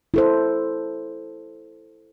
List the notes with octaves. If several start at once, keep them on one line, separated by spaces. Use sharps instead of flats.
E4 A4 C5